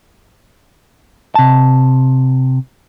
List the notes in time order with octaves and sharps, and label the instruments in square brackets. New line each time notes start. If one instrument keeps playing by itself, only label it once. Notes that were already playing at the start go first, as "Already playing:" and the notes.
[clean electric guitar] C3 A5